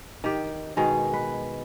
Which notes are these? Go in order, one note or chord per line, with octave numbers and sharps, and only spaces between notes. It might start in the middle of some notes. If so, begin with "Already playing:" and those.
D#3 G4
B2 D#3 G#3
B4